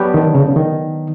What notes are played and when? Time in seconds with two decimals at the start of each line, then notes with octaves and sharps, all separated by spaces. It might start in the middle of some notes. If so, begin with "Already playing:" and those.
Already playing: F#3 B3 D4 G4
0.14 D#3
0.35 C#3
0.56 D#3